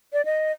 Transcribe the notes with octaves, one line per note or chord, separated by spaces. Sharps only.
D5
D#5